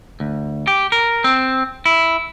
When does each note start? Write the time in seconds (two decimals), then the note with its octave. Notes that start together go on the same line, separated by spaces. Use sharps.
0.20 D2
0.67 G4
0.92 A#4
1.24 C4
1.86 E4